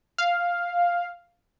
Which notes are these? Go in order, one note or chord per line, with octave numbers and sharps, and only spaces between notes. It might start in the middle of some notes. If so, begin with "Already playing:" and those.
F5